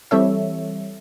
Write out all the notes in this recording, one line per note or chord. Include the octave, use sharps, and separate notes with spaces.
E3 G3 C4 A4 C#5 E5